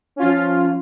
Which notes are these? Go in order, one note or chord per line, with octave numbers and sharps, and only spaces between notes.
F3 C#4 F4